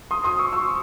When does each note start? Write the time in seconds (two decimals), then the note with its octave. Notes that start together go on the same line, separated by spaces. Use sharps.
0.11 C6 D#6
0.24 C6 D#6
0.39 C#6 E6
0.52 C#6 E6